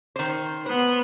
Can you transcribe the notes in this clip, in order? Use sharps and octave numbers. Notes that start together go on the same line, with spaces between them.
D#3 C5
B3 C5